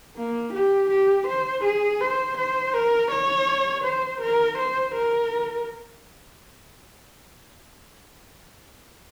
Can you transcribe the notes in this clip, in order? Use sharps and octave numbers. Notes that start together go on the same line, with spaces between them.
A#3
G4
G4
C5
G#4
C5
C5
A#4
C#5
C5
A#4
C5
A#4